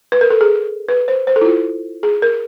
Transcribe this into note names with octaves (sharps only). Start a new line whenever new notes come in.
B4
A#4
A4
G#4
B4
C5
C5
A4
E4
F4
G#4
A#4